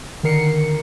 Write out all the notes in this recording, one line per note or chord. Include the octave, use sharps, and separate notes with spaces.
D3 D#3 A#4 C7 C#7